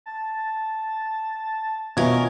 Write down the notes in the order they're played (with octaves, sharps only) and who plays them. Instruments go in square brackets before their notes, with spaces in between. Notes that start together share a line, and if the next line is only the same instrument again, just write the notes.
[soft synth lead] A5
[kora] B2 C#4 [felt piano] B3 E5 G#6 [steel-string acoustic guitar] F4 A#4